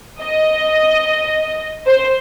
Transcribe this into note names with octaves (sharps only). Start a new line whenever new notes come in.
D#5
C5